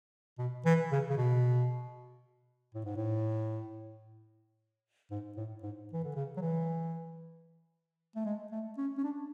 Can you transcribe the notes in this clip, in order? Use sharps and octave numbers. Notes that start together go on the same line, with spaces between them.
B2
E3
C#3
C#3
B2
A2
G#2
A2
G#2
A2
G#2
E3
D3
C#3
F#3
E3
A3
G#3
A3
C#4
C#4
D4